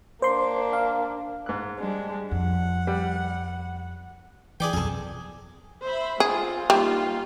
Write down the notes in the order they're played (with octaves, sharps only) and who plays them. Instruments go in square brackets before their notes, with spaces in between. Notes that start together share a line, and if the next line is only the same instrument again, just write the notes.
[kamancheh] A#3 D4 [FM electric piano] C5 C6
[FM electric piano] F5
[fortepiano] G#2 F#6
[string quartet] G3 G#3 D4
[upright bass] F2 [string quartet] F#5
[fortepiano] G3
[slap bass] E3 [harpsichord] G#4 D5 G5
[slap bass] B1 F2 [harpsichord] G#4 A4
[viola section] C5 E5 B5
[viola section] G#3 C4 F4 [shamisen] G#4
[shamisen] G3 [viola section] A#3 D#4 F4